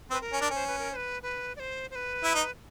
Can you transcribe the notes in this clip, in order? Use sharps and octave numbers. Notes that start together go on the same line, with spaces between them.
C4 B4
A#4
C#4
D4
C#4 C5
B4
A#4
C5
B4
B4
D5
C5
C5
B4
E4
D#4